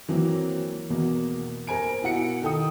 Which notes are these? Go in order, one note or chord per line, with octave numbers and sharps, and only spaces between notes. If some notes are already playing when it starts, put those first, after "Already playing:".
E3 F#3 A#3 C4
E2 B2 A#3
A#4 C5 G#5 D7
B2 E4 F#5 C#7
D#3 A4 G5 D#6